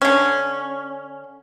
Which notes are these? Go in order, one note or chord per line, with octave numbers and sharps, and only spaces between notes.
D3 C#4